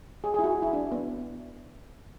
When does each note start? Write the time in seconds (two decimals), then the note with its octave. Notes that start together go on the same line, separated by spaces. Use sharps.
0.24 G#4
0.34 G#4
0.39 E4
0.44 F#4
0.62 E4
0.73 D4
0.92 B3